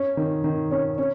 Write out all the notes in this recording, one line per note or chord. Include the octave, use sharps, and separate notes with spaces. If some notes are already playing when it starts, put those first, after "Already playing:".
Already playing: C#4
D#3
D#3
C#4
C#4